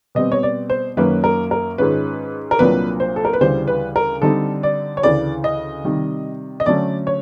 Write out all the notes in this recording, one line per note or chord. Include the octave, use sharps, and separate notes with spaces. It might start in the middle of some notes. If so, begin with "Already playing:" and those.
B2 G3 C4 D#5
C#5
D5
C5
F#2 D#3 F#3 A#3 C#4 B4
A#4
A#4
G#2 D#3 G#3 C#4 F4 B4
A#4
C2 A#2 F#3 A#3 D4 B4
C5
A4
A#4
B4
D2 C#3 E3 G3 C5
B4
A#4
D3 G3 C4 D#4 A4
D5
C#5
D2 C#3 E3 D5
D#5
C3 D#3 G3
D#5
D3 F#3 A3 C#4 D5
C#5